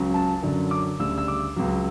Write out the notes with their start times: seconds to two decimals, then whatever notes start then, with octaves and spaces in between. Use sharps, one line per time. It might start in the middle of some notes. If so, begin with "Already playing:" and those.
Already playing: C#2 C#3 F#3
0.14 A5
0.42 F#2 D3 F#3
0.71 D6
0.99 D2 C#3 G3 E6
1.18 E6
1.28 D6
1.56 C#2 C#3 F#3